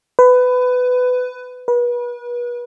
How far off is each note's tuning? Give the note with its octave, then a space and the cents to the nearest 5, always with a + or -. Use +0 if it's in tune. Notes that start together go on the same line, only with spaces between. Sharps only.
B4 +20
B4 -35